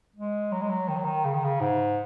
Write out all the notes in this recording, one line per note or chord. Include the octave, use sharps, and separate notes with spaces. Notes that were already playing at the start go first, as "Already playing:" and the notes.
G#3
F#3
G#3
F#3
D#3
F#3
D#3
C#3
D#3
C#3
G#2